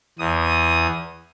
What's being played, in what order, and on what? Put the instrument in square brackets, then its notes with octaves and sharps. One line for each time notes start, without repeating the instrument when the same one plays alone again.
[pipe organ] E2 D#6